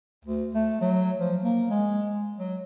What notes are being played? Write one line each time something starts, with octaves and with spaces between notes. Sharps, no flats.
D2
A3
F#3
F3
A#3
G#3
F#3